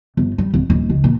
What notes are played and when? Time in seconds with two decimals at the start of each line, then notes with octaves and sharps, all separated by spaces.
0.17 G1
0.38 G3
0.54 D1
0.70 D#1
0.90 C#2
1.04 A#2